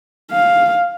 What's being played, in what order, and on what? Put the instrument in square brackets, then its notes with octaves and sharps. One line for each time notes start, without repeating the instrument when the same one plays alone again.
[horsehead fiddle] F5